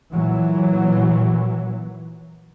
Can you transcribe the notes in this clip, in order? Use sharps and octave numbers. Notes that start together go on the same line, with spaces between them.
A#2 E3 F#3